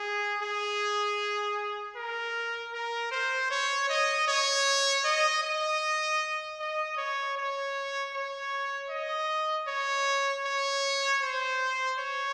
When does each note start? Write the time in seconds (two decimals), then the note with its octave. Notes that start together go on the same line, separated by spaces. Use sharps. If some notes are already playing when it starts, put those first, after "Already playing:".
Already playing: G#4
0.42 G#4
1.96 A#4
2.74 A#4
3.11 C5
3.51 C#5
3.90 D#5
4.28 C#5
5.05 D#5
5.43 D#5
6.60 D#5
6.97 C#5
7.37 C#5
8.13 C#5
8.90 D#5
9.68 C#5
10.45 C#5
11.22 C5
11.99 C#5